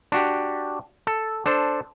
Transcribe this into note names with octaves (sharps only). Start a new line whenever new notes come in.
D4 F#4 G4
A4
D4 A4 C5